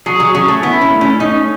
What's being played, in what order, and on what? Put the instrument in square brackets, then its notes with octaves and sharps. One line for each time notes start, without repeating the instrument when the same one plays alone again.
[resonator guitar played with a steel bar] F#3 [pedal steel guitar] G#4
[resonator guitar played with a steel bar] F#3
[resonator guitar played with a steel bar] F#3 [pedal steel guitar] C#4
[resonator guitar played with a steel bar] A3
[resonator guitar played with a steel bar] B3 [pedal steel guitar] E4
[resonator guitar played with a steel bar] C#4
[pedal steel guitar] A3
[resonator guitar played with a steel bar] C#4
[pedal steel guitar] C#4 [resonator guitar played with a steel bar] D#4